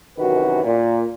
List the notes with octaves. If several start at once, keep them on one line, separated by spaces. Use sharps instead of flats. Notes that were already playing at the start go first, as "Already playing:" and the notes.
F#2 C3 D#3 E3 F#4 B4
A#2